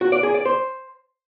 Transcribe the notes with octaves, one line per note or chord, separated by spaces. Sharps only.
F#4
D5
G#4
D5
C5